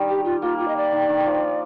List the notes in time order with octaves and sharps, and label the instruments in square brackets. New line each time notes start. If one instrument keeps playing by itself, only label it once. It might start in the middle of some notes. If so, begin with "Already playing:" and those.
Already playing: [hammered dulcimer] D#3 G3
[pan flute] G4
F4
[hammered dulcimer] A#3 [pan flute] F4
[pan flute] F4
D#5
D5
[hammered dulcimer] D#3
D#3
F3